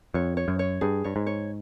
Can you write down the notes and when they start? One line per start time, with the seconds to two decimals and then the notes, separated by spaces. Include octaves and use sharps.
0.14 F2 C#5
0.37 C#5
0.48 F#2
0.59 C#5
0.81 G2 G#4
1.04 G2 C#5
1.16 G#2
1.26 C#5